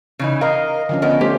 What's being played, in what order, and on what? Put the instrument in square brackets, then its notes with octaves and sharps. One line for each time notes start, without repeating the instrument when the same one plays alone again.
[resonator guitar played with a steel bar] C#3 E3 D#4
[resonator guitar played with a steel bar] A#4 [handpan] D#5 F5
[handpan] D3 F3 C#4
[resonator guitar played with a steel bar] B3 A#4 D#5
[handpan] A3 C#4 C5 [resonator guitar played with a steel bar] G4